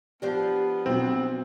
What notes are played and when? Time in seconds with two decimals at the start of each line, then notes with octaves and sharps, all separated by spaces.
0.22 F3 B3 D4 G4
0.86 B1 F#3 C4